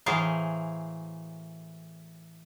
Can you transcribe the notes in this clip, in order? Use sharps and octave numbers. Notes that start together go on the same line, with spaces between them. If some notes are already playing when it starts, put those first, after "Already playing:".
A2 E3 F#3 G#4 C5 F5